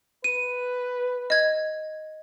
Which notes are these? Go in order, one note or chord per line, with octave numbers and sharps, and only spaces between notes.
B4 D#7
D#5 G#6